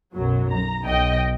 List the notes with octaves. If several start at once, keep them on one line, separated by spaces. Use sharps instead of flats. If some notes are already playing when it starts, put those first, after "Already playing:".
B1 F#2 F#3
A#5
B1 D#5 G5